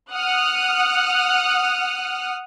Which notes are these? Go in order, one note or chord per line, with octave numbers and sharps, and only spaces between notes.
F#5 D#6 F6 F#6